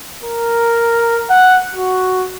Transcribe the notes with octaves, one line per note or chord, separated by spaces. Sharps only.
A#4
F#5
F#4